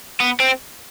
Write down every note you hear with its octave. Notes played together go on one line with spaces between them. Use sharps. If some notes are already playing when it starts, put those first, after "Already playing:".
B3
C4